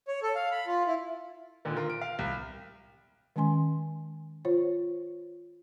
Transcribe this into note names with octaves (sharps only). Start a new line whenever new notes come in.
C#5
A4
F5
B5
F4
E4
A#2 D3 D#3
F4 A#4
D7
F5
C2
D#3 G#3 C#4 G#5 C6
F4 C5 C#5